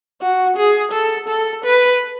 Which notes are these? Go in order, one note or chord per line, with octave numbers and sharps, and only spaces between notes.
F#4
G#4
A4
A4
B4